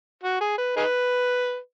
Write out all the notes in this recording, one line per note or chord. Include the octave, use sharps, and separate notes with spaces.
F#4
G#4
B4
D#4 G#4 B4